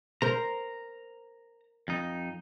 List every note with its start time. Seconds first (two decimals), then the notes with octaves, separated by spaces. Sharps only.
0.22 A#4 C5 A#5
1.88 F2 D#4